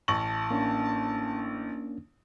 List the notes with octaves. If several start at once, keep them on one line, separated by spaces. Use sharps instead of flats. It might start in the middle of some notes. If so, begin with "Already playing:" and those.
A1 A5 C#6 F#7
A#3 C#4 D4